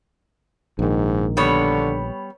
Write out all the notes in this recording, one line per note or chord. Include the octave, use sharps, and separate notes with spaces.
A#1 G#2 D#3
D3 G3 B3 C#5